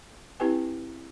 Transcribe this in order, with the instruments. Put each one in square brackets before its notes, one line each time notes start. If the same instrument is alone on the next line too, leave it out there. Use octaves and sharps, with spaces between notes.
[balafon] C4 E4 G4 B4 G5 G#5